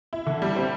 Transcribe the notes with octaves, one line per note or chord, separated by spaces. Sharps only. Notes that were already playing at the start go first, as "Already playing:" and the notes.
E4
D3
G3
C4